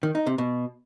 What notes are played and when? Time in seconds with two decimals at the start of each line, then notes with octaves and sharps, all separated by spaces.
0.03 D#3
0.15 D#4
0.27 C3
0.38 B2